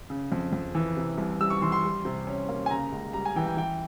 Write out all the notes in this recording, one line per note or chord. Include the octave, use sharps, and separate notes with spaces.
C#3
F2
F2
E3
C3
C2
G3 E6
C#6
E3 C6
C6
G3
C3
C#4
A#3
G#5
C#3 A#5
C#2
G3 A#5
G#5
E3 G5
G5
E3 G5